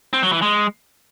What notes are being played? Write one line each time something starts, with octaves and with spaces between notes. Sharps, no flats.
C4
F#3
E3
G#3